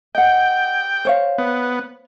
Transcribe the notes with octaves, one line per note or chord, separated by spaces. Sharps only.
D#5 F#5 G5
C5 C#5 F5
B3